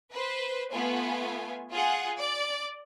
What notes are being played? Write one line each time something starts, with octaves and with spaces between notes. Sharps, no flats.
B4 C5
A3 B3 F4 G#5
F4 G#4 F#5
D5